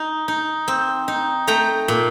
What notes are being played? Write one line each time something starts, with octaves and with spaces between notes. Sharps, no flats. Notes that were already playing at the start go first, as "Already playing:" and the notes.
Already playing: D#4
D#4
C4
D#4
A3 G5 A#5
A#2